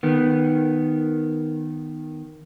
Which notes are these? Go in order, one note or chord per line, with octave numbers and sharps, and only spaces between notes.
D#3 B3